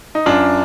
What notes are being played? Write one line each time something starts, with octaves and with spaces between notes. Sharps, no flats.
D#4
F#2 D4 F4